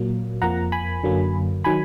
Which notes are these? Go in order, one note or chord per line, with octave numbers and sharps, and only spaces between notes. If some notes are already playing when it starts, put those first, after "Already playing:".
Already playing: A#2 F#3 A#3
F2 F3 A#3 F#5 A#5
G#5 B5
F#2 D3 F#3 A#3
D#3 F#3 G#5 B5